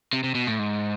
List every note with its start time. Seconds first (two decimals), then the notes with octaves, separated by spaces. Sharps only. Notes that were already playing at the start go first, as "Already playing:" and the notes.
0.13 C3
0.24 C3
0.35 B2
0.47 A2
0.59 G#2